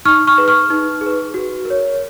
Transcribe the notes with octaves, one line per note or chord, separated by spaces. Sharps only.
D#4 C#6 F6
C#6 F6
G#4 B4
C#6 F6
D#4
G#4
B4
F#4
A#4
C#5